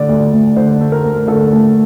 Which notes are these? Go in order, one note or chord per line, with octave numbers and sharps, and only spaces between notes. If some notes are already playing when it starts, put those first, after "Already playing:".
Already playing: D3 A3 D5
D2
D2
D3 C5
A3
A#4
D2
D3 A4
A3